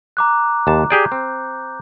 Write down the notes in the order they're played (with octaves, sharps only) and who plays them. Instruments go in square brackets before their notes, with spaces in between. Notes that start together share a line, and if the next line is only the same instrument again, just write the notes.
[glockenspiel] A#5 D6 F#6
[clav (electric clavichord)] D#2 A5
[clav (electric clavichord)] G4 G#4 D5 [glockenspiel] G6
[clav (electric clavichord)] C4